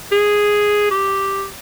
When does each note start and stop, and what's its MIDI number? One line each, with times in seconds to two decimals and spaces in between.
0.12 0.88 68
0.91 1.45 67